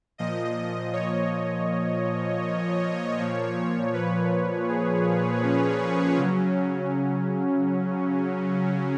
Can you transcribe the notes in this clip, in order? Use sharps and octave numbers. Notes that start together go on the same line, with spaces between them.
A#2 F3 D#5
C#5
A#2 F3
B4
G#4
C#4
C#3 F#3